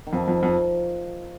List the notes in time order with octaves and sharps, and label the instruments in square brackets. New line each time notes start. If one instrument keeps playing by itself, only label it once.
[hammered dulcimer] D#3
[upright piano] F2 [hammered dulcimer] F3
[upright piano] F2
F2